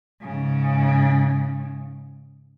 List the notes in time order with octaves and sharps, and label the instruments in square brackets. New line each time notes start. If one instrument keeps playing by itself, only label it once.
[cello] G#2 C#3